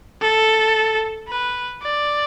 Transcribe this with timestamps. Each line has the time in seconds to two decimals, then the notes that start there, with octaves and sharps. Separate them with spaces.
0.21 A4
1.29 B4
1.82 D5